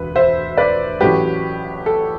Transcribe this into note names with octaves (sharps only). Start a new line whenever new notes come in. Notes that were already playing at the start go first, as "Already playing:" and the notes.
Already playing: E1 D2 B4
C5 E5
B4 D5
A1 A2 F#3 A3 G4 B4
A4